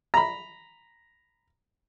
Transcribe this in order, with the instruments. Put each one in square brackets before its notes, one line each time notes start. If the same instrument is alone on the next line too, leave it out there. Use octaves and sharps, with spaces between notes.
[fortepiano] A#5 B5